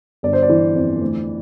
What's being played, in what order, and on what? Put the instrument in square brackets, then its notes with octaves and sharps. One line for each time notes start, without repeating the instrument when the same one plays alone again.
[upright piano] G1 D5
C5
D5
E3
F2
D2